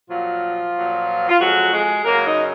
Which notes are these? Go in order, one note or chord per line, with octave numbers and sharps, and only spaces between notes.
A#2 F3 F#3 F4
A#2 F#3
F4
F2 F3 F#3 G#3 F#4
G#3 G#4
F#2 C#3 F#3 A#3 A#4
D#4 D#5